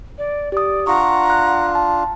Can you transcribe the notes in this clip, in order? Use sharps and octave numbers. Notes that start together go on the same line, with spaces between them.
D5
G4 D5 D#6
D4 F4 F#5 A#5 C#6
F#6
A5